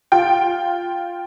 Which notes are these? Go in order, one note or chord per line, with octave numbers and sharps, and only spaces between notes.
F4 G5